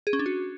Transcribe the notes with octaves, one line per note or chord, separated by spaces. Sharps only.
G#4
C#4
D4
F#4